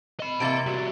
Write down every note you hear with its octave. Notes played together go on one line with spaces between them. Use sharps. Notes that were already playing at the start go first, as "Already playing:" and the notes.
D#5 B5
C3 E3 A#3 E5 A6 D7
G3 F#4